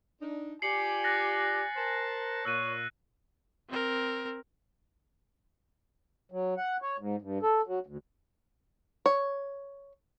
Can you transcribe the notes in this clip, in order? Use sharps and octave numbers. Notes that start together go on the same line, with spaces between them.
D4 D#4
F4 G4 D5 G#5 C7 C#7 F#7
F#6 A6 A#6
A#4 C5 A5
A#2 C#5 E6 F#6 D#7
C4 A#4
F#3
F#5
C#5
G#2
G2
A4
F#3
D2
C#5